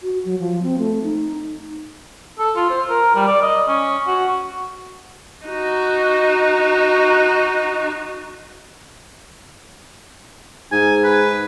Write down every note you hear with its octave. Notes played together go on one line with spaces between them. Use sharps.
F#4
F#3
F3
C4
A3
D#4
A4
F4
C5
A#4
G3
D5
D#5
C#4
F#4
D#4 F#4
G#2 G#5
B4